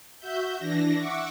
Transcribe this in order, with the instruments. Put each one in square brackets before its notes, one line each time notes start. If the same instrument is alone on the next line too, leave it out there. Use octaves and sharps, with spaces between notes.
[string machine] F#4 E5 G6
E3 D4 A#6
E5 F#5 C#6 D6